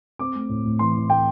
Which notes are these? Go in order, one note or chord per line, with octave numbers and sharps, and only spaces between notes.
C4 D6
A3
A2
A2
E3 C6
E3
A3 G5